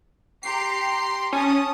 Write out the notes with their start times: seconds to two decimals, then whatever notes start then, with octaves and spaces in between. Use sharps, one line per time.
0.43 G4 A#5 C6 C7
1.33 C#4 A5 D#6